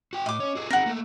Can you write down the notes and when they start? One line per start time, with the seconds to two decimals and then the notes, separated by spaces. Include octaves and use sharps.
0.13 F#4 G5
0.26 A2 D#5 D6
0.40 C#4 C#5
0.55 F#4 G#4 A4
0.71 C4 D#4 G#4 A#4 F#5
0.86 A3 A#3